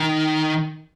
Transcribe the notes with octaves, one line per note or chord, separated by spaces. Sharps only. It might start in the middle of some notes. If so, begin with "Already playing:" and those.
Already playing: D#3